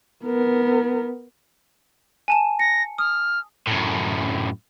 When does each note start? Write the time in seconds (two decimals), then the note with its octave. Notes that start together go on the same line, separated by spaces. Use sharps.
0.24 B3 A#4
2.28 G#5 A5 E7
2.59 A#6 C#7
2.98 D#6 F6
3.67 F#2 A2